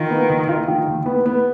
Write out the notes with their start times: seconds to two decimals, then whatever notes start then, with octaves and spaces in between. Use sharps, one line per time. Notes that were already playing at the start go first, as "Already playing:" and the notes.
Already playing: D#3 F4
0.10 B3
0.29 D#2
0.49 F4
0.68 D#3
0.87 D#2
1.06 B3
1.26 B3